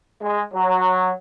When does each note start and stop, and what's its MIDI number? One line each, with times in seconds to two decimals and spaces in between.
0.22 0.41 56
0.54 1.10 54